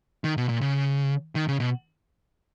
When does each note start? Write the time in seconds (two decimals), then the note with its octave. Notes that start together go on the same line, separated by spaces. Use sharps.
0.24 D#3
0.37 B2
0.49 A#2
0.61 C#3
1.35 D#3
1.48 C#3
1.60 B2